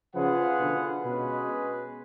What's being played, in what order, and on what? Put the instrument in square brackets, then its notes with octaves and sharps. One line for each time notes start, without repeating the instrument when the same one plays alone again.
[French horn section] C#3 F3 [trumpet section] F4 G#4 B4 F#5
[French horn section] B2 D3
[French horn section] B2 [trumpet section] G#3 C#4 G#4 B4